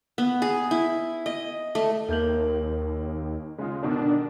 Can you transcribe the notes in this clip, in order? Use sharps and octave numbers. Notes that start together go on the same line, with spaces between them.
B3
G#4
E4
D#5
A3
D#2 A#3 G6 F#7
C#3 G#3 F4
G1 B2 D#3 D4